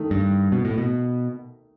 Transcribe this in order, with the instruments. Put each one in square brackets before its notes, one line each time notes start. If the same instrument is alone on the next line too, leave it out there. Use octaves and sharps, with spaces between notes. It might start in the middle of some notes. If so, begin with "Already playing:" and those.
Already playing: [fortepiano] D#3 A3
[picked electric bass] G2
B2
A2
B2